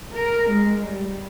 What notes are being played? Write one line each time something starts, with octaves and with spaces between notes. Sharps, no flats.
A#4
G#3
G3